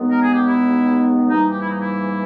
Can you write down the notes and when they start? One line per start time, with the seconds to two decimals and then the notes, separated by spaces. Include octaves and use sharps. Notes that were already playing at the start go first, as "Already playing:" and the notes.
Already playing: D#2 D#3 G#3 B3
0.10 A#4
0.22 G#4
0.34 G4
0.46 E4
1.29 G#2 E3 G3 A#3 D#4
1.50 G4
1.59 E4
1.70 D#4
1.80 E4